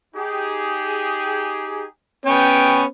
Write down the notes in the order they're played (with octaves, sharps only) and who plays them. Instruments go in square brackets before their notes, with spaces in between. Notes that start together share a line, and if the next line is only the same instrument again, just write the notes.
[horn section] D#4 G4 G#4
[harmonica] B3 C#4 [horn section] G5